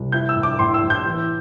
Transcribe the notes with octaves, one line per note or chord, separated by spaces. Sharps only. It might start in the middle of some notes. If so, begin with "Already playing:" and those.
Already playing: C2
E4 G6
E6
A2
D6
A2 C6
E6
A2
G6
E3